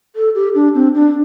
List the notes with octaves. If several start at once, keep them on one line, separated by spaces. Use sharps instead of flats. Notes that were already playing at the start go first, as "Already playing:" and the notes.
A4
G4
D4
C4
D4